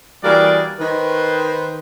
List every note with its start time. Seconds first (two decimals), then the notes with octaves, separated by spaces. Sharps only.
0.23 E3 G3 A#3 F#4 G#4 D5
0.79 D#3 B4 C5